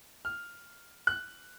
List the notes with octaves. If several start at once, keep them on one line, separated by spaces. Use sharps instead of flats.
F6
F#6